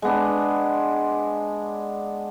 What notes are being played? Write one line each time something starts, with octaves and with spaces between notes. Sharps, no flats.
G#3 B3 D4